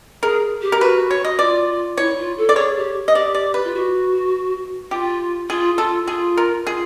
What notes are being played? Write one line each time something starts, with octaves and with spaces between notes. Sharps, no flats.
G#4 A#4
G4
A#4
F#4 B4
C#5
D#5
F4 D5
E4 C#5
F4
A4
D5
G#4 C#5
G4
D#5
G4 D5
D5
B4
F4
F#4
F4 G4
F4 G#4
F4 A4
F4 G#4
A#4
F4 G#4